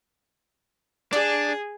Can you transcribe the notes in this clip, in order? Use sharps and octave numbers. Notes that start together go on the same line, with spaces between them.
D4 G#4 D5